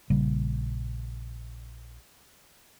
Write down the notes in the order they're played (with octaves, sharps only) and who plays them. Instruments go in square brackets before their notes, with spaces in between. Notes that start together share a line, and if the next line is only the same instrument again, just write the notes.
[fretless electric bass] A#1 C#3 G3 A#3